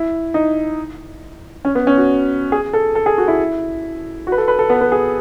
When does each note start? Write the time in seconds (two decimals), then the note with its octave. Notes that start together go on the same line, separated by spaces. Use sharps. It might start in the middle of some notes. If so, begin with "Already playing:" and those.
Already playing: E4
0.34 D#4
1.65 C#4
1.75 B3
1.87 C#4
1.97 F#4
2.52 G#4
2.73 A4
2.95 A4
3.06 G#4
3.18 F#4
3.28 E4
4.27 F#4
4.32 B4
4.38 A4
4.48 B4
4.59 A4
4.70 B3
4.81 B3
4.92 G#4